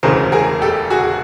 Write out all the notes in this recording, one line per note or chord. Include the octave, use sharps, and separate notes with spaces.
E1 D2 C#3 E3 A#4 C5
G#4 A#4
G4 A4
F#4 G#4
G#4